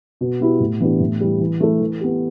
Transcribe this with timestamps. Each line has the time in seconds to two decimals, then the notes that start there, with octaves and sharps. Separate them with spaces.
0.21 B2
0.40 B3 E4 G4
0.60 A2
0.80 E3 B3 D4 G4
1.00 A2
1.20 E3 G3
1.40 E3
1.60 A3 E4 A4
1.81 E3
2.01 B3 G4